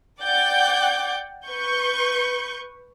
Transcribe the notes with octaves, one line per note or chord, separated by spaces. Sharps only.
D5 F#5 G5 D6 G6
B4 C#6 G6